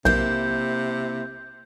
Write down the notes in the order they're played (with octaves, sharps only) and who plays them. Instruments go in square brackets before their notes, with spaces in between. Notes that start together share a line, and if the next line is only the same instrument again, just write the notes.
[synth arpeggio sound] B1 [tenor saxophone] C3 [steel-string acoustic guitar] A#3 E4 [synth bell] G6